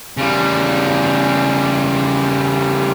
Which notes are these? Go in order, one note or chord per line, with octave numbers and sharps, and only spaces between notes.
C#3 G3